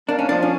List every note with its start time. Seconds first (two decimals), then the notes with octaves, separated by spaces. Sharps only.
0.09 A#3 D4
0.19 C#4
0.29 F3 D4
0.43 C#4